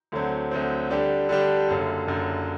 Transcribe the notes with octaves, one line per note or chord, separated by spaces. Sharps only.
D2 D3 F#3 C4
D2 D3 F#3 C4
D3 G3 D4 G4
D3 G3 D4 G4
F#1 F#2 D3
F#1 F#2 D3